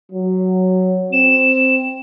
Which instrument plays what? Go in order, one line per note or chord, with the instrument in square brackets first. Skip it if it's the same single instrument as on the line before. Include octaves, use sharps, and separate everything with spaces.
[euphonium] F#3
[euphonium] C4 [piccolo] E7